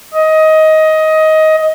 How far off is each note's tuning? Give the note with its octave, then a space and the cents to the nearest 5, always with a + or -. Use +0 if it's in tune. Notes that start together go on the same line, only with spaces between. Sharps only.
D#5 +15